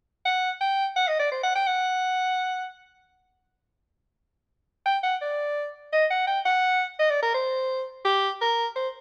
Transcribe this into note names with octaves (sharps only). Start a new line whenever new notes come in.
F#5
G5
F#5
D#5
D5
C5
F#5
G5
F#5
G5
F#5
D5
D#5
F#5
G5
F#5
D#5
D5
A#4
C5
G4
A#4
C5